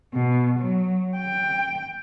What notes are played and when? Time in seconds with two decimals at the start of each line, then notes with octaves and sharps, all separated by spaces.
0.14 B2
0.60 F#3
1.17 G5